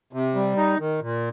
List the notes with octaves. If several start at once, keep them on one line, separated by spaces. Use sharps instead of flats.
C3
G3
D#4
D#3
A#2